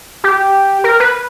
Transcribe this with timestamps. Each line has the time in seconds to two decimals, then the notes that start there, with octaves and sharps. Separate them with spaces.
0.24 G4
0.84 A#4
1.00 B4